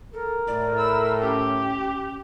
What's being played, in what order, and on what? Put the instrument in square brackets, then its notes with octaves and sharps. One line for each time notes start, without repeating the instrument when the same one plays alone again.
[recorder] A4 [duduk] A#4
[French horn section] A2 [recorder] D5
[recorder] B5 [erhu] E6
[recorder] C#4 [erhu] G4